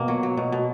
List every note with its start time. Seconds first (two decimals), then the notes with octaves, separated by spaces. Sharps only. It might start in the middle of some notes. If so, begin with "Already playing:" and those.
Already playing: B2 A#3
0.08 F#3
0.23 F#3
0.37 B2
0.52 B2